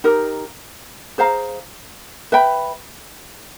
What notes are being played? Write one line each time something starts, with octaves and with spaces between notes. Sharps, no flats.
D#4 G4 A#4
G#4 C5 F5 A#5
B4 E5 G5 B5